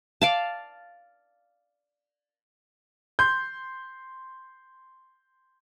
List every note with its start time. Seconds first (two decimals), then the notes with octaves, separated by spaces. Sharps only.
0.22 D5 F5 A5
3.19 C6 G6